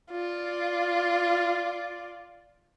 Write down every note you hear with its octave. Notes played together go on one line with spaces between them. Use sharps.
F4 D5